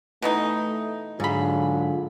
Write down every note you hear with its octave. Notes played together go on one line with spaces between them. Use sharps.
B2 E3 A3 D#4
G#2 D3 F#3 F4 G#4 B5